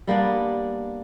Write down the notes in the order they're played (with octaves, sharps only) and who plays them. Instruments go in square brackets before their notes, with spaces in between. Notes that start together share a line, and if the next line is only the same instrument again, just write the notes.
[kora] G3 A#3 B3 D4